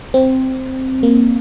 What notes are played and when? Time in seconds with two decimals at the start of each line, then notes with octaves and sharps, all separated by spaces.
0.14 C4
1.03 A#3